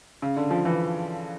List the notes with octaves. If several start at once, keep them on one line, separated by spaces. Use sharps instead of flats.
C#3
D3
F3
E3